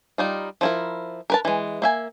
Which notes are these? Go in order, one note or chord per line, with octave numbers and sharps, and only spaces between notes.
G3 D#4 F4
F3 E4 A#4
A#4 B4 A5
E3 G#3
A#3 E5 G#5